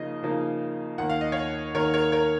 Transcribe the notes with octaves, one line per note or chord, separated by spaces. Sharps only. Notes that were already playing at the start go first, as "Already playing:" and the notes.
Already playing: C#3 F3 A#3 D#4 D#5
C#3 F3 A#3 D#4
D#2 D#3 A#3 F#5
F5
D#5
C#5 F5
D#2 D#3 A#3 A#4 C#5
A#4 C#5
A#4 C#5